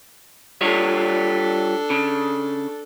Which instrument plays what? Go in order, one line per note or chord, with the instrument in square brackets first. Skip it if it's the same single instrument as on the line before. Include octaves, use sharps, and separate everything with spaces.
[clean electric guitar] G3 F4 C#5 [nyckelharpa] D4 A4
[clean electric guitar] C#3